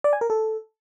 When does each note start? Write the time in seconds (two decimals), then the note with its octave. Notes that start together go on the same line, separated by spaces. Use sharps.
0.04 D5
0.13 G#5
0.21 A#4
0.30 A4